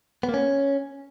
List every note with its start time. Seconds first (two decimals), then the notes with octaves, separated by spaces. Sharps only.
0.23 B3
0.29 A#3
0.34 C#4